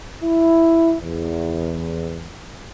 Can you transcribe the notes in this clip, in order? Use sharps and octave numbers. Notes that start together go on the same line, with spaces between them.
E4
E2